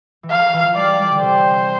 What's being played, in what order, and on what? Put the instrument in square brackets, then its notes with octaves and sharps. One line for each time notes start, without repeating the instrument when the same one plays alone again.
[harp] E3
[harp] F3 [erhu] F5
[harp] E3
F3
[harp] G3 [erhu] D5
[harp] G3
D3
[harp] C3 [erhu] C5